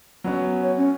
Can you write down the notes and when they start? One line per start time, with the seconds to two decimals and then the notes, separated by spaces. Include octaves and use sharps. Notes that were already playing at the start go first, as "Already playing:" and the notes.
0.24 F#3 B3 C#4
0.62 C#5
0.77 C#4